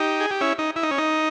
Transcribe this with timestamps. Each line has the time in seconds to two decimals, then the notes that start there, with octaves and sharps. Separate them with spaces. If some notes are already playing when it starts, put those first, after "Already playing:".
Already playing: D#4 G4
0.20 G#4
0.31 G4
0.41 C#4 E4
0.58 D#4
0.76 E4
0.83 D#4
0.91 C#4
0.98 D#4